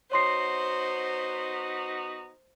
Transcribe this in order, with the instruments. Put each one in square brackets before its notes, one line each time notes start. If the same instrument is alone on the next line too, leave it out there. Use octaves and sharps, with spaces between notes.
[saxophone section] B3 D#4 F#4 [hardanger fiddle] C5 [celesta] C#5 C6 C7